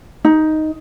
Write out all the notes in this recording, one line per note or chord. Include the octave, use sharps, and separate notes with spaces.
D#4